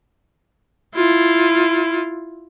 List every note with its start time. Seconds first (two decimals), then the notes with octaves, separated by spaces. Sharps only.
0.95 E4 F4